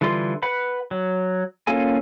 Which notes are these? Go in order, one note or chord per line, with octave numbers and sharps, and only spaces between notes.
D3 E3 G3 F4 C6
B4 F#5 B5
F#3
A#3 C#4 F4 A4 G#5